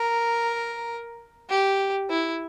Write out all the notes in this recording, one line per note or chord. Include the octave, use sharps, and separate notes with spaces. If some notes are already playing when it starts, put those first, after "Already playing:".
Already playing: A#4
G4
E4